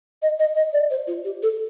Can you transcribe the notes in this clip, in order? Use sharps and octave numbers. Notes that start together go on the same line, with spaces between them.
D#5
D#5
D#5
D5
C5
F4
G4
A4